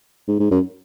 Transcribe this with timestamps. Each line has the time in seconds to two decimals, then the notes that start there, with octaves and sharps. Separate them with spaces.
0.28 G#2
0.40 G#2
0.51 F#2